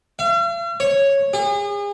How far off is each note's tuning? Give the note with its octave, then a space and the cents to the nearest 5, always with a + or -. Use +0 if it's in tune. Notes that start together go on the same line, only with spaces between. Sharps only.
F5 -45
C#5 -5
G#4 -40